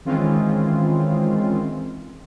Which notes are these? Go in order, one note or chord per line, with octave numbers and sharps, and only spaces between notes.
D#3 E3 G#3 C4 C#4 F4